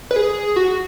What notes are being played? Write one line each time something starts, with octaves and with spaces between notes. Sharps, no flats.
B4
G#4
F#4